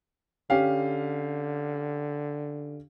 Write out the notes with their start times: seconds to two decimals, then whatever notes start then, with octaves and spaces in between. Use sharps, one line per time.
0.50 D3 C#4 G4 F5